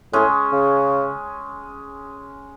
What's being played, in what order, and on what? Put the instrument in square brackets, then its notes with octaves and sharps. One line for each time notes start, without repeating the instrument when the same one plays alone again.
[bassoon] A2 [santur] G#3 C#4 G#4
[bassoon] C#3